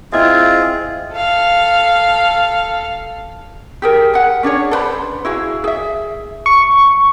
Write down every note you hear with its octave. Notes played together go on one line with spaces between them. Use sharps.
C4 E4 F4 G#4 D#5 E5
A4 F5
G4 G#4 A#4
F#5 G#5
C#4 D4 G#4 C#5
A4 B4 C5 B5
E4 F#4 G#4 F5
G#4 E5
C#6